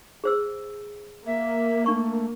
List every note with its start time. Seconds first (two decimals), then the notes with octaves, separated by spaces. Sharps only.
0.24 G#4 C5 E6
1.26 A#3 E5
1.86 A3 D4 C#6